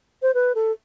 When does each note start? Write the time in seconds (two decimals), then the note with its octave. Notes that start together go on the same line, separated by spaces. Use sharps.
0.22 C5
0.34 B4
0.55 A4